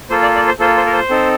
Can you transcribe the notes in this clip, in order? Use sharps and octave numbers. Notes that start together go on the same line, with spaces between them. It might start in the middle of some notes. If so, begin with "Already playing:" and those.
A#3 F4 A4 C5
D5
D5
C5
A#3 F4 A4 C5
C5
A#4
C5
C4 D#4 A4